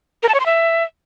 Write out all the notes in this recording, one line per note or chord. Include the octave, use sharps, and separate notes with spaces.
A#4
A5
C#5
C6
E5